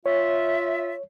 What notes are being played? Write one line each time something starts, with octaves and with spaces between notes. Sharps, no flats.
F4 C#5 E5